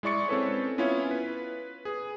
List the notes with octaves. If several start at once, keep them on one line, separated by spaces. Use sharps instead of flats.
G#3 E4 D5 C#6 C#7
C4 C#4 A4 B4 C#5
B3 C#4 E4 F4 C#5
B4
G#4